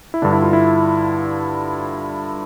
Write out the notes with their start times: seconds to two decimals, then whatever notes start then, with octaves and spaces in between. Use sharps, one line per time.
0.14 E4
0.22 G2 D3 D4
0.32 E4
0.42 F4
0.53 E4